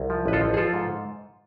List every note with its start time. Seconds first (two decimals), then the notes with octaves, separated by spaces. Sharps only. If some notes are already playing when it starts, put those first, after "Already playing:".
Already playing: C2
0.10 F3
0.26 A1 B4
0.33 F4 A4
0.41 F3
0.54 G#4
0.57 F3 F4 A4
0.73 G#2